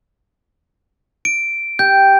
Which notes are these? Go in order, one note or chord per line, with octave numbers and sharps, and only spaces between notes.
D7
G4 G6